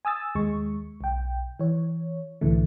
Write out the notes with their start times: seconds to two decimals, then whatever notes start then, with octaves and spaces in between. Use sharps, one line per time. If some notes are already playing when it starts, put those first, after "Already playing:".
0.05 G#5 D#6 E6 A6
0.35 D#2 G#3 C#6
1.01 B1 G5
1.60 E3 C#5
2.41 C2 A2 D3 E3 A3